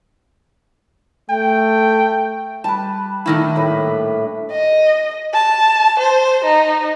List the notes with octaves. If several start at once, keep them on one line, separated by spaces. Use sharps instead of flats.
A3 G5
G3 B4 A5
A#2 D#3 A3 D4 E4
A2 B4 B5
D#5
A5
C5
D#4